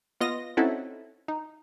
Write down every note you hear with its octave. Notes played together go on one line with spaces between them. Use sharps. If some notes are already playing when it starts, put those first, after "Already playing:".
B3 F4 D#5 A#6
C4 C#4 D#4 E4 F#4 A4
D#4